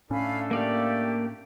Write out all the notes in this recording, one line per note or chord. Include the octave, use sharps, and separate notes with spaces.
A2 A3 C#4 D4 A4 F5 G#5 B5
A#3 G4 D5 F5